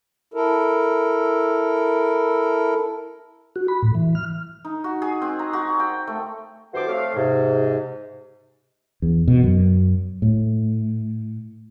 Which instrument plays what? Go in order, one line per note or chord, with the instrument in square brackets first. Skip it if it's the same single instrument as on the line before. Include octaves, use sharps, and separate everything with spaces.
[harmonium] E4 A4 A#4
[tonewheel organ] F#4
B5
A2
E3
F6
[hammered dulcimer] D#4
F#4
G#4
C4
A#5
F#4
G5
A3
[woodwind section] G2 E3 F#4 A4 C5 D6
A3 C4 C#5 F5
G#2 C3
[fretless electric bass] E2
B2
F#2
A2